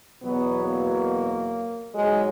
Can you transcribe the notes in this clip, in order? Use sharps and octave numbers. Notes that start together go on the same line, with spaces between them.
E2 B2 F#3 B3
A#3
G#2 F#3 G#3